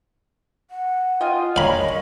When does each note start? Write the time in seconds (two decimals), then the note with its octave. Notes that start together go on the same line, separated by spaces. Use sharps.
0.71 F#5
1.21 F4 D#5 G5 G#5
1.56 D4 G#4 A#4 C#5 D#5 F5 B5